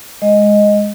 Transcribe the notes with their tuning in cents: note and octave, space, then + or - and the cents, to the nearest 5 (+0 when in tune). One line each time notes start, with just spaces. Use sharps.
G#3 +0 D#5 +0